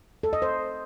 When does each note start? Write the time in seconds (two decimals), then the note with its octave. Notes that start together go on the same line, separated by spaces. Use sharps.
0.23 A4
0.33 D#5
0.42 C5